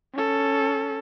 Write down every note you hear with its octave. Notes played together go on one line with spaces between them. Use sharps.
C#4 A4